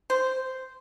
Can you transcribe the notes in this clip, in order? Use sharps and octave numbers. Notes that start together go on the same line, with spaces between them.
C5